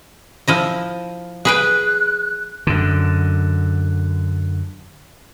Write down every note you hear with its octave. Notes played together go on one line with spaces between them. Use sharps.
F3 E4 D#5
G#4 B4 G5 F#6
F#2 D3